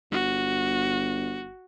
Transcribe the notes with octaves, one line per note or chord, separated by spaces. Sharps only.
G1 F#4